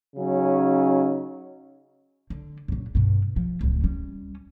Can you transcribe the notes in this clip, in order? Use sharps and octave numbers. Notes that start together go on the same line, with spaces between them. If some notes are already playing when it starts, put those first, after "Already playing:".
C#3 F#3 C#4 D#4
D3
A#1 F#2
G2 B2
F3
D1 C#2
G3 C#4